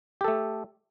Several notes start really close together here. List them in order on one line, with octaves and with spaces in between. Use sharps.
G4 A4 A3